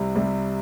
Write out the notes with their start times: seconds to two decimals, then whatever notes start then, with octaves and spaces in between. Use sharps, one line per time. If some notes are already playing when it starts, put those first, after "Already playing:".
Already playing: C2 C3 G3
0.16 C2 C3 G3